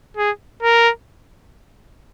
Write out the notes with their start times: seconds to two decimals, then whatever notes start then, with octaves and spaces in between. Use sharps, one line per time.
0.17 G#4
0.63 A#4